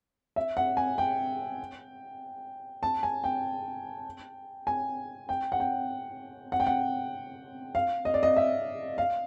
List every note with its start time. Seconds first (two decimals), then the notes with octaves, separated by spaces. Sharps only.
0.36 E5
0.57 F#5
0.77 G#5
0.98 G5
2.83 A5
3.03 G#5
3.24 G5
4.67 G#5
5.29 G5
5.52 F#5
5.60 G5
6.52 F#5
6.60 G5
6.67 F#5
7.75 F5
8.05 D#5
8.14 D5
8.23 D#5
8.36 E5
8.98 F5